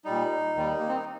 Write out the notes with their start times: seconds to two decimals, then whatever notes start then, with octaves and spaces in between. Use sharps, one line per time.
0.05 A#2 G3 D#4
0.55 D#2 D#3 G3
0.79 A#3
0.88 C4
0.96 D#4